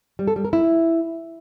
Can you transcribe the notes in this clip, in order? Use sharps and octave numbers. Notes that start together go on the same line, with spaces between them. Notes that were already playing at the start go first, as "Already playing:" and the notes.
G3
A4
G3
A#4
E4